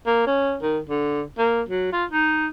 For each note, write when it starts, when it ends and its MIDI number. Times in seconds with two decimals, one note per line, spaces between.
0.06 0.26 58
0.26 0.56 61
0.62 0.79 51
0.89 1.22 50
1.38 1.62 58
1.69 1.87 54
1.92 2.05 65
2.11 2.47 63